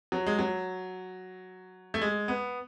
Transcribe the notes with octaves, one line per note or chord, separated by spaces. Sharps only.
F#3
G#3
F#3
A3
G#3
B3